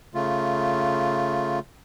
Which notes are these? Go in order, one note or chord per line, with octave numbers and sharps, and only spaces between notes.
C#3 A3 F4